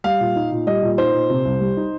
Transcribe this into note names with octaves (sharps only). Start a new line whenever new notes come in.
G3 F5
A#2
D#4
A#2
G3 D#5
A#2
D#4 C5
A#2
C3
C2
G3
D#4